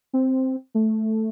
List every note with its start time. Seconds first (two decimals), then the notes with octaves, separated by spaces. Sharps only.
0.13 C4
0.75 A3